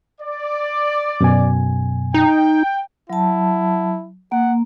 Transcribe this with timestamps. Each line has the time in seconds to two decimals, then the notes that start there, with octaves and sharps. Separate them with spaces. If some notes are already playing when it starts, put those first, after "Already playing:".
0.21 D5
1.21 F#2 B2 G#5
2.14 D#4 G5
3.10 F#3 E4 A5
4.32 A#3 F#5